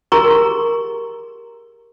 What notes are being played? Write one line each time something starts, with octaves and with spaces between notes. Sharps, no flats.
G4 G#4 A#4 A#5 C6 C#6